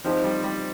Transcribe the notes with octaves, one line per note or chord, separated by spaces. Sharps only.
F3 C4 D#4 G4 C5
G3
G3